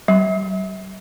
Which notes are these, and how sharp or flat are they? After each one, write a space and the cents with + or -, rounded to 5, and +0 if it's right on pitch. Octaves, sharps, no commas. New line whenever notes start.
G3 -45